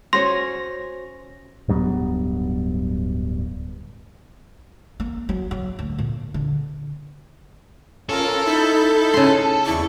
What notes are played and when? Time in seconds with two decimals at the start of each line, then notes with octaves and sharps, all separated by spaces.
0.13 C#4 F#4 C5 C#5 G#5 C6 A#6
1.68 D1 G2 F#3 B3
5.00 A#3
5.29 F#3
5.51 F#3
5.79 D2
5.98 A#2
6.34 D3
8.09 C#4 F4 A4 A#4
8.46 D#4 E4 B5 G6
9.14 C#3 C6
9.66 E2 E4 D5 C#6